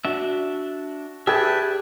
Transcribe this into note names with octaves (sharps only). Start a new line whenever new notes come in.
D4 F#4 E5
G4 G#4 B4 D5 E5 G5 A5 E6